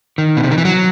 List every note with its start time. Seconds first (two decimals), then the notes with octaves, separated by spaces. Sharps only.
0.18 D#3
0.37 B2
0.44 C3
0.51 D#3
0.58 E3
0.65 F#3